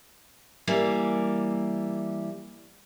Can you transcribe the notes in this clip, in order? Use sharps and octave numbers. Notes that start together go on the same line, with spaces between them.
E3 G3 A#3